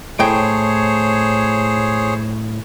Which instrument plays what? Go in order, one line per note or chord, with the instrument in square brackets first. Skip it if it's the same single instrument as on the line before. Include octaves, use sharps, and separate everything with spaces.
[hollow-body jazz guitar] A2 G5 [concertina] G#4 C5 C#5